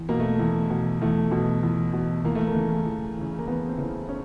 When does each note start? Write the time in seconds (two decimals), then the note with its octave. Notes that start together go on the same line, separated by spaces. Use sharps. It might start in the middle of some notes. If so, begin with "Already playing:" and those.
Already playing: E2
0.09 B2 A#3
0.20 A3
0.40 E2
0.71 B2
1.02 E2 A3
1.32 B2
1.63 E2
1.93 B2
2.25 E2 A#3
2.35 A3
2.47 A#3
2.55 C#3 E3
2.85 E2
3.17 C#3 E3
3.39 A#3
3.47 E2 B3
3.69 C4
3.78 C#3 E3
4.09 C#4